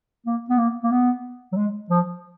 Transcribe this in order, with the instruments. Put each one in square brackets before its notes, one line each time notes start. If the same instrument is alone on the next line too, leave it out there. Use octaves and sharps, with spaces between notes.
[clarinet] A#3
B3
A#3
A#3
B3
F#3
G#3
F3